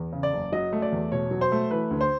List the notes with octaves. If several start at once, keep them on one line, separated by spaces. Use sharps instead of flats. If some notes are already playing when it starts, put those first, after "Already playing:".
Already playing: E2
C#3
D5
F#1
F#3 D#5
A3
D5
E2
B2 C#5
F#3
C5
A3
E3 B4
D2
C5